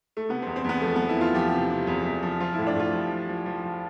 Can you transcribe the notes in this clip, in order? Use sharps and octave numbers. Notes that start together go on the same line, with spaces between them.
A3
C3 B3
E2 C4
C4
E2 B3
F3 A3
F3 B3
E4
E2 F4
F3 G4
C3 G4
C3
E2
E2
F3
F3 F4
E4
A2
D4
A2 F4
F3 G4
F3
F3
F3
F3